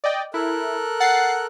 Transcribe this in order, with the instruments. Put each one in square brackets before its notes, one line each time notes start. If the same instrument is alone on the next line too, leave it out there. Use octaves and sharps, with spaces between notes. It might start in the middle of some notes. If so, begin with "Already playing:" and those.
[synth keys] D5 D#5 G5
[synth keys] E4 [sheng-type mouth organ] A4 A#4 F#6
[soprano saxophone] F#5 [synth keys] A6 C7